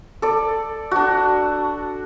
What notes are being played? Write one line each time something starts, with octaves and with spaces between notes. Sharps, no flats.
A4 D5
D4 F#4